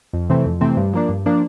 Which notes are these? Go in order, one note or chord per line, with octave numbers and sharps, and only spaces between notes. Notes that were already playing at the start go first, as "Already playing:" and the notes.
F2
C3 E3 A3 C4
F2
C3 E3 A3 C4
G2
F3 A#3 D4
G2
F3 A#3 D4